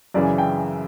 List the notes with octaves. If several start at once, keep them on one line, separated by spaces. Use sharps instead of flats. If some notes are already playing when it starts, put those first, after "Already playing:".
F#2 C#3 E3 D5
G5